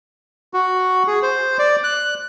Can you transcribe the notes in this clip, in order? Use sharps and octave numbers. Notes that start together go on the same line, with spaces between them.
F#4
G#4
C5
D5
F#6